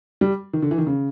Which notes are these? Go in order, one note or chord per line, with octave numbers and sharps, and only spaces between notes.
G3
D#3
D3
E3
D#3
C#3